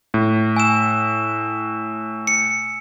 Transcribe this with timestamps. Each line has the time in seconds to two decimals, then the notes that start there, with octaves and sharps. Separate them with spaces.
0.14 A2
0.56 G#5 E6 E7
2.27 C#7